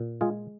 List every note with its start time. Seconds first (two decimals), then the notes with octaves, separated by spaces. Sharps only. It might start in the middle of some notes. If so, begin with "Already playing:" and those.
Already playing: A#2
0.21 G#3 F4 G#4